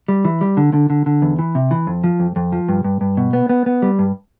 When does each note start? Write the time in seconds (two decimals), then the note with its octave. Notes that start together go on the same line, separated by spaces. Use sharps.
0.08 G3
0.25 E3
0.41 G3
0.57 D3
0.73 D3
0.90 D3
1.06 D3
1.22 E2
1.39 E3
1.55 C3
1.71 E3
1.87 F2
2.04 F3
2.20 F2
2.36 F2
2.52 F3
2.69 G2
2.85 G2
3.01 G2
3.17 B2
3.33 B3
3.49 B3
3.66 B3
3.82 G3
3.99 G2